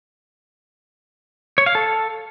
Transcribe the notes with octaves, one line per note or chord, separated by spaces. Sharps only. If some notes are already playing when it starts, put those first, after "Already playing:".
C#5
F5
A4